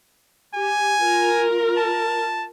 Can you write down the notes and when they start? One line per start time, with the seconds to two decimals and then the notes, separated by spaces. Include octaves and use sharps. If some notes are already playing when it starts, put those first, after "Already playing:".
0.54 G4 G#5
1.00 F4 A#4
1.77 A5